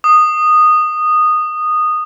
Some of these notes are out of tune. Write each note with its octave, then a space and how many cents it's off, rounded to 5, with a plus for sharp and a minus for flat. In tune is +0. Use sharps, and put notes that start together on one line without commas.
D#6 -15